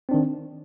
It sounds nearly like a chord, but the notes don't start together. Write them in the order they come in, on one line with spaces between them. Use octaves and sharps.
C4 D4 D#3